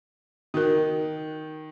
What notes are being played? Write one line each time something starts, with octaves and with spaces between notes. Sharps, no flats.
D#3 F#4 A#4